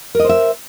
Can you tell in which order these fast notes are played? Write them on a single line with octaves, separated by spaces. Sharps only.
A#4 D#5 C5 E5